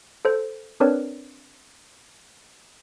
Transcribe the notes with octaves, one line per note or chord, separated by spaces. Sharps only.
A4 C5
C4 D4 A#4 B4 C#5 D5